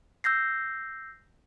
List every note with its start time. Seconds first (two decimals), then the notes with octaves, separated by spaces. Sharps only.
0.24 E6 G6 A#6 C7